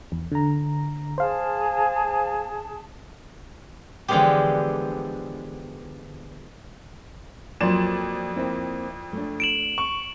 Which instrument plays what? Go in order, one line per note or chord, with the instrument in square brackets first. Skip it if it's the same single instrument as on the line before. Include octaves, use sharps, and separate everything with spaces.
[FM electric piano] E2
D3 A#5
[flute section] G#4 A5 [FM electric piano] C5 F5
[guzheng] D3 E3 F3 G#3 B3 G4
[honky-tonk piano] F2 D5 E7 [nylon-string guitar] F#3 A#3 F4
[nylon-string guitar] A#3 C4 E4
A3 D4
[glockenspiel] D7 E7 F#7
[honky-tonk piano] C#6